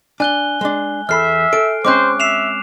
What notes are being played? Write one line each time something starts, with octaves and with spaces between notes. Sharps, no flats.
D4 G#5 F#6 G7
G#3 D4
E2 A4 E5 B5 F6 C7
A4 D7
G#3 C4 C#4 C5 D6 F#6
E5 C7 E7 F7